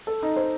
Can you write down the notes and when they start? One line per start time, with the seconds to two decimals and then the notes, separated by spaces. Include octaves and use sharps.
0.07 A4
0.23 D#4
0.36 C5